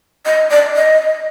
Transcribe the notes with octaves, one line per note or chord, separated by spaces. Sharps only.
D#5
D5
D#5